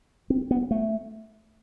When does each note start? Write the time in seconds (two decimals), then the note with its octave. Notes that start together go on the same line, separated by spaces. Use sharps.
0.30 C4
0.51 B3
0.71 A3